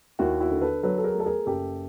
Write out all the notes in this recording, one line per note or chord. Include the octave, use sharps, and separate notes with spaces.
D#2 E4 F#4
E4 F#4
D3
A4 B4
F#3 A4 B4
A4
G#4 A#4
A3
A4
G#4 A#4
F#1 G4 A4